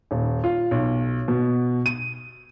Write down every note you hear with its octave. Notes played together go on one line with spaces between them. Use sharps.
D#1
F4
B1
B2
D#7